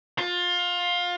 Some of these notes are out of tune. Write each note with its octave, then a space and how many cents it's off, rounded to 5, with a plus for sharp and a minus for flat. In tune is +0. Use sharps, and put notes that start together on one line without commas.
F4 +20